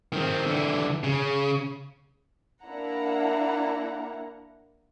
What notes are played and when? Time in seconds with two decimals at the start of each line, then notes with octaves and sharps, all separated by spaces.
0.13 D#3 C4
0.47 D3 E3
1.04 C#3
2.63 A#3 D4 E4 F#5 A#5